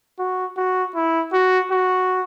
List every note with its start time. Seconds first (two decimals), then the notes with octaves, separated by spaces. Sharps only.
0.19 F#4
0.57 F#4
0.95 E4
1.33 F#4
1.72 F#4